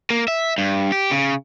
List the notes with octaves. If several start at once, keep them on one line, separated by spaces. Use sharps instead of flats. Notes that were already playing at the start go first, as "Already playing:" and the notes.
A#3
E5
G2
G4
C#3